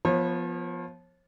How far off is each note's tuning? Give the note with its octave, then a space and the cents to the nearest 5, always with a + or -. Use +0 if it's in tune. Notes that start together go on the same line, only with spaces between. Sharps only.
F3 +0 B3 -10 C#5 -45